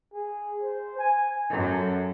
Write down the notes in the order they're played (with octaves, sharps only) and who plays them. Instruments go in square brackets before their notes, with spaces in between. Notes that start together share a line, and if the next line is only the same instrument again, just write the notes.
[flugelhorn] G#4
C5
G#5
[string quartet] F#2 [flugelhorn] A4